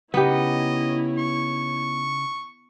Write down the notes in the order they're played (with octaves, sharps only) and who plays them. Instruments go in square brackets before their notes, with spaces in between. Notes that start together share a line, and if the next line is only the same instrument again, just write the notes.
[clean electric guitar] C#3 D#4 [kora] B3 G4 [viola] E4 C#5 [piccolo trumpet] D#5
[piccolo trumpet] C#6